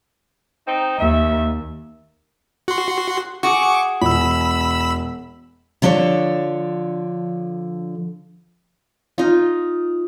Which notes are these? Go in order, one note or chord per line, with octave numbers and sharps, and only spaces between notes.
C4 D#4
D#2 E5
F#4 C6
F#4 G#4 C#6 D6
E1 B5 E6
D3 F3 D4 A4 C#5
D#4 F4